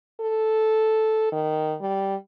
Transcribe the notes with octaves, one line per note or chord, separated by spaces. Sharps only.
A4
D#3
G3